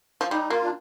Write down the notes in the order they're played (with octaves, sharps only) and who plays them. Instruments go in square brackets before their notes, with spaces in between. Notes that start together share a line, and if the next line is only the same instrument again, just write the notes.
[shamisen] F3
[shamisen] G3 [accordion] D#4
[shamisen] A#3 [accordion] F4
[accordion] D4